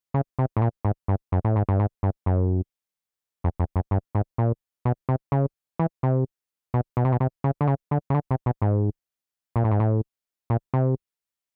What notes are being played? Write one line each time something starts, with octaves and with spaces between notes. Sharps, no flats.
C#3
C3
A2
A#2
G#2
G2
F#2
A2
G#2
G2
G#2
G2
F#2
F2
F2
F#2
G2
G#2
A#2
B2
C3
C#3
E3
C3
B2
B2
C3
B2
C3
C#3
D3
C#3
D3
C#3
D3
C3
B2
G#2
A#2
A2
G#2
A2
A#2
C3